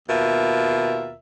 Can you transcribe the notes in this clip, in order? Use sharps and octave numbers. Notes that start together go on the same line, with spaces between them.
D#2 B2 F4 A#4 E5